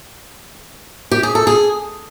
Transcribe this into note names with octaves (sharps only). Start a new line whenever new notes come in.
G4
G#4
A4
G#4